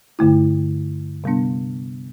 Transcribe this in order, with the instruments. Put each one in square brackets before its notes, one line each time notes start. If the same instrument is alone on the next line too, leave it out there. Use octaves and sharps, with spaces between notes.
[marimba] G2 D3 A3 E4
C3 G3 B3 D4